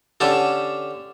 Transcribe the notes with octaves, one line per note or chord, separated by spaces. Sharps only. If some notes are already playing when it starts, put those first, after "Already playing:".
D3 C#4 G4 A4